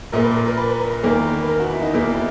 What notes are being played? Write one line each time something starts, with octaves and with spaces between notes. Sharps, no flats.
A#1 A#2 A#3 A#4
B4
A#4
A#4
B4
B4
A#4
A#4
E2 D#3 A#3 A#4
B4
A#4
F#4
E4
D#4
E1 E2 B2 A#3 E4